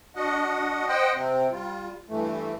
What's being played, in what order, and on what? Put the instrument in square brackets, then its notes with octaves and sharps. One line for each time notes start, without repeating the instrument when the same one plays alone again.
[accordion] D4 F#4 D#5 F#5
C5 D#5 F#5 G5
C3 C4
G3 F4
G2 E3 A3